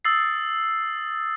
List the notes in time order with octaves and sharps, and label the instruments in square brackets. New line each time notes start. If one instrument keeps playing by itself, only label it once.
[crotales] D#6 E6 A6 C7